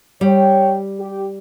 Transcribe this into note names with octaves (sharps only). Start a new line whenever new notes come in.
G3 C#5 G5
G4